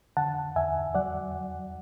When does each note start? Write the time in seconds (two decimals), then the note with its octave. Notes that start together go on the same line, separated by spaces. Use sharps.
0.17 D3 F#5 A5
0.56 E2 E5 G#5
0.95 F#3 D5 F#5